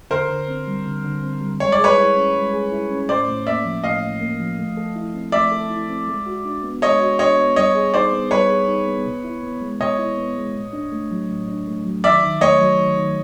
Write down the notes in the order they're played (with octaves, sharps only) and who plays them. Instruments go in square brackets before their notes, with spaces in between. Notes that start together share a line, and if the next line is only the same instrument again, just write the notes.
[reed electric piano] D3 [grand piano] A#4 C5
[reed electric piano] D3
C4
G3
D3
D3
C4
G3
[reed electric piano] G#3 [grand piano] C#5
[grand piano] D5
[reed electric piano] G#4
[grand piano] B4 C#5
[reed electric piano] E4
C#4
G#3
G#4
E4
C#4
[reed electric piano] A2 [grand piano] C5 D5
[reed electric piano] A2
[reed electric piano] A#3 [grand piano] D5 E5
[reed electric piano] F3
[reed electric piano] A2 [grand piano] D#5 F5
[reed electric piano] A2
A#3
F3
A3
A4
E4
C4
[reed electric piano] A3 [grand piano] D5 E5
[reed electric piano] A4
E4
C4
G#3
F#4
D4
B3
[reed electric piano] G#3 [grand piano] C#5 D#5
[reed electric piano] F#4
[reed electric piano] D4 [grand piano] C#5 D#5
[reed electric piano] B3
[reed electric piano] G3 [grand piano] C#5 D#5
[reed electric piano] G#4
[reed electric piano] D#4 [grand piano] C5 D5
[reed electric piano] B3
[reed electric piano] G3 [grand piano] B4 C#5
[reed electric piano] G#4
D#4
B3
B2
E4
B3
G#3
[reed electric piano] B2 [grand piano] C#5 D#5
[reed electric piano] E4
B3
G#3
A2
D4
A3
F#3
A2
D4
A3
F#3
[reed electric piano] D#3 [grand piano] D5 E5
[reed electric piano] D#3
[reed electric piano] A3 [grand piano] C#5 D#5
[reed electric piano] F#3
D#3
D#3